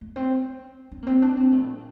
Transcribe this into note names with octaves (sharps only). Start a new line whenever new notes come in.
A3
C4
D4
A#3
C4
D4
C4
A3
A#2